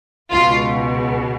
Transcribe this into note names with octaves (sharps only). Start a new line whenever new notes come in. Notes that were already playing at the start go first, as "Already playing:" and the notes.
C#2 B2 F4